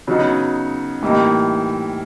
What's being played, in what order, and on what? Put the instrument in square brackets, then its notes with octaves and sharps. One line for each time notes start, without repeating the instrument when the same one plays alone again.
[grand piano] C#3 F#3 B3 D#4 F#4
A2 E3 G3 A#3 D#4